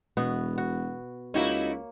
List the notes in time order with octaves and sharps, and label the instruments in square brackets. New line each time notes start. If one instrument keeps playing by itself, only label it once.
[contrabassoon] E1 [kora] B2 B3 F#4
[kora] F#4
[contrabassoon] C#2 [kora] A#3 C#5 [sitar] D#4 E4 F#4